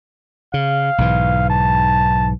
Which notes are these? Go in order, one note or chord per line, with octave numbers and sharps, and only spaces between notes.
C#3 F5
B1 G#2 E3
A5